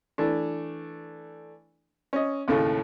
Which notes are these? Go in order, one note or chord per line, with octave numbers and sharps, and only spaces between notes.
E3 A3 D4
C#4 D#5
D#2 A2 C#3 A3